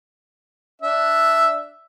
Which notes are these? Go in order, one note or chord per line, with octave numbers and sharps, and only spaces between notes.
D4 E5